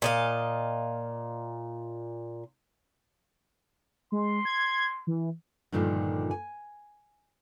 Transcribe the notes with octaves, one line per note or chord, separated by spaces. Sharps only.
A#2 D#5 F5
G#3 C6
G#6
E3
G2 A#2 D3 D#3 F3 A3
G#5